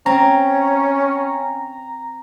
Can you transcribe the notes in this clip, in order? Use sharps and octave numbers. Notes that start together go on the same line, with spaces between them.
C4 C#4 A#5